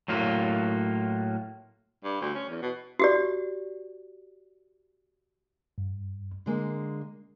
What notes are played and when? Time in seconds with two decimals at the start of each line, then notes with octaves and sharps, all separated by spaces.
0.08 A2 F#3 A#3 F4
2.04 G2
2.21 D2
2.35 C#4
2.49 E2
2.62 B2
2.99 F#4 G4 D5
5.78 G2
6.46 D3 G#3 A#3